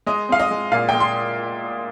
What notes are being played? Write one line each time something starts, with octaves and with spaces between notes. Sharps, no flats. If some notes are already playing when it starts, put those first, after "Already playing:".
G#3 D#5
C4 F5
D#5
G#3
A#2 F5
G#3 G5
C6